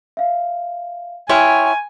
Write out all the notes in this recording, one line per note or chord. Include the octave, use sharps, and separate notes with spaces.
E5 F5
E4 C#5 G5 G#5 C6 F6